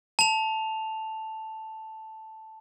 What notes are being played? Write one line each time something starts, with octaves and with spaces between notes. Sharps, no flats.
A5 F7